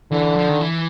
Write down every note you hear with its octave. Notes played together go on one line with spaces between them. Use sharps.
D3 E3
F3
D#3
E3